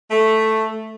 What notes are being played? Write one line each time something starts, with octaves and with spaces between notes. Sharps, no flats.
A3